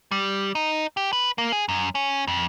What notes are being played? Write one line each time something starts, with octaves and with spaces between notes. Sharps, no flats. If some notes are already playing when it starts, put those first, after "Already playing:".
G3
D#4
G4
B4
A#3
G#4
F#2
C#4
F2